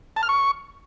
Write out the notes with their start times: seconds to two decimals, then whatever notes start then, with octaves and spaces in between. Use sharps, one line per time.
0.16 A5
0.23 F6
0.29 C#6